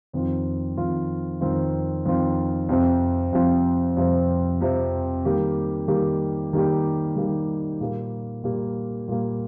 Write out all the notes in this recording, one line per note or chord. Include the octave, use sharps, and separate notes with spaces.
F2 D#3 C4 F4
F2 D#3 C4 F4
F2 D#3 C4 F4
F2 D#3 C4 F4
F2 C3 F3 C4
F2 C3 F3 C4
F2 C3 F3 C4
F2 C3 F3 C4
D#3 G3 A#3 G4
D#3 G3 A#3 G4
D#3 G3 A#3 G4
D#3 G3 A#3 G4
A#2 G3 A#3
A#2 G3 A#3
A#2 G3 A#3